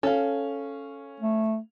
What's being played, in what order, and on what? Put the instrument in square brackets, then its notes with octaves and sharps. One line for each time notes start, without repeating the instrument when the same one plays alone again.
[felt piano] C#4 F5 [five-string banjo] A4
[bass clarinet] A3